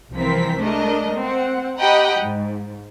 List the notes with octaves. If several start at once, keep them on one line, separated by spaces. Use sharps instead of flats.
C2 E3 F3 C4 A#4 B6
G#3 A3 D4 A#4 D#5
C4 F#5
G4 D#5 F#5 G5 A#5 B5
G#2